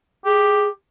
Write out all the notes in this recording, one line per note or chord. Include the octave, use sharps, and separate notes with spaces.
G4 G#4